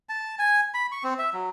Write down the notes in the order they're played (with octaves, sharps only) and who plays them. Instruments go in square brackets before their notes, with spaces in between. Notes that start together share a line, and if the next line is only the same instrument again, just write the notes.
[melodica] A5
G#5
B5
C#6
C4
E5
F#3